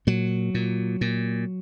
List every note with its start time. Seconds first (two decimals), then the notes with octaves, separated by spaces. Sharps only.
0.07 A#2 F#3
0.54 A#2
1.01 A#2